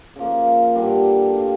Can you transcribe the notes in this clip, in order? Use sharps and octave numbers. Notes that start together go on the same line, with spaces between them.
C#3 F3 A#3
G2 D3 G3 D4
A2 G3 D4 F4